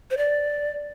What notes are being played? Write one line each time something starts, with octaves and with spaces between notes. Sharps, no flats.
C5
D5